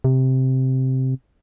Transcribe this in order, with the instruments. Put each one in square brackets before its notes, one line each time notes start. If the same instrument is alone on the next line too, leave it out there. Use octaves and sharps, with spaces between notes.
[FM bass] C3